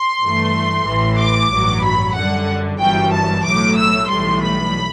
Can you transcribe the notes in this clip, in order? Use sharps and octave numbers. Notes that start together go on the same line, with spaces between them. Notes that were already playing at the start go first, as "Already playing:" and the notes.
Already playing: C6
G2 E3 A3
A1 A2 E3
D6
A1 G2 F#3
B5
F#2 D3 G3 F#5
G1 F#2 E3 G3 G5
A5
B1 A2 F#3 D6
E6
B1 A2 E3 G3 C6
B5